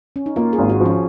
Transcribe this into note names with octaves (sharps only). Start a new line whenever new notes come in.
C#4
D#4
A#3 F4
G#4
G#1
F#4
F3
C#4